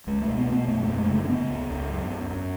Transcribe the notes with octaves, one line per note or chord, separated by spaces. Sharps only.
C#2 G#3
A3
B2
B3
B2
B3
F#2 A3
A3
F#2
G#3
C#3
A3
C#4
C#3 B3
C#2
C#2
F#2
F#2
F#2